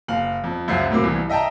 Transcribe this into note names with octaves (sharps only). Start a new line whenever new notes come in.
F#1 F5 F#7
F2
C#2 F#2 C5 E5 F#5 C7
A2 C3 F#3 A#3
C2 E3
D#5 E5 G5 A5 A#5